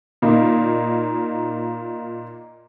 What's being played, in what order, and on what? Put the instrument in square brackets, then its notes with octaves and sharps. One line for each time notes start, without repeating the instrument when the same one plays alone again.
[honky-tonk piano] A#2 A#3 D#4